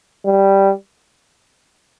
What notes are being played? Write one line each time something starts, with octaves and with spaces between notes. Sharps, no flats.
G3